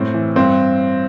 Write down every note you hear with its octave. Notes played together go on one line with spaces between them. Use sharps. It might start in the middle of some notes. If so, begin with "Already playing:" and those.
Already playing: A2 C4
E3
G2 C4